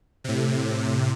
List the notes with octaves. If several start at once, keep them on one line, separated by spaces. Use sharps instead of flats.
A2 C3